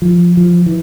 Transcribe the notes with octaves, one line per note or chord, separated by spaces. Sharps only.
F3
F3
E3